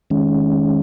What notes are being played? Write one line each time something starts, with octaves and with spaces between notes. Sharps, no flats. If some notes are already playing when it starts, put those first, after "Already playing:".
D#3 G#3 C#4